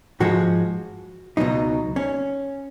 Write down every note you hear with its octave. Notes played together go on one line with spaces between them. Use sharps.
G#2 F3 G#3 F#4
C#2 B2 F#3 D#4
C#4